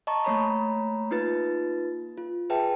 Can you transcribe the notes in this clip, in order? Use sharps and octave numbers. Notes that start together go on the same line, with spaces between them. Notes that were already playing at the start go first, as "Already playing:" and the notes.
D#5 A5 A#5 C#6
A3 A#3 C#5 A#5 B5
A#3 D#4 F4 B4 A6
F4
G#4 B4 E5 G5 A5